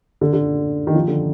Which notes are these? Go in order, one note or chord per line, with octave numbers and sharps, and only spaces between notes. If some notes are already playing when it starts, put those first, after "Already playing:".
D3
D3
D#3
F3
D3